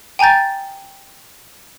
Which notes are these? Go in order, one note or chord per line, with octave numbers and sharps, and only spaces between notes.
G5 G#5 A#5 G6 A6